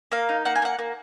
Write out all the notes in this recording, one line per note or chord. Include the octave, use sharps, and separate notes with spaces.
A#3 F5
D#4
A#3 F#5
G#5
A#3 F#5
A#3